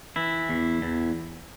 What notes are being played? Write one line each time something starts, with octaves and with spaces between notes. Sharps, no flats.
E3 E4
E2
E2